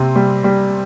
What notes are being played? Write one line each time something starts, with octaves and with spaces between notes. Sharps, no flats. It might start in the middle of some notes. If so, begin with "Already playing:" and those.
Already playing: C3 C4
G3
G3